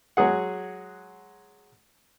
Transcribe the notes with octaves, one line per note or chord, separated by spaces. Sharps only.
F#3 G#3 G#4 F#5